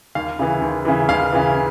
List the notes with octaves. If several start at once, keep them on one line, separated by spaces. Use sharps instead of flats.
D#2 F5
C#3 E3
D#2
C#3 E3
D#2 F5
C#3 E3